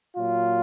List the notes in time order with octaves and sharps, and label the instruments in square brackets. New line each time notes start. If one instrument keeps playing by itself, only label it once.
[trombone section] A#2 F#3 F4